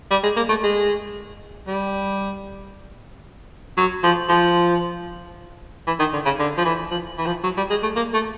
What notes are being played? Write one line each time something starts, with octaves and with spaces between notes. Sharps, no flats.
G3
G#3
A#3
A3
G#3
G3
F#3
F3
F3
E3
D#3
D3
C#3
D3
F3
E3
F3
E3
F3
F#3
G3
G#3
A3
A#3
A3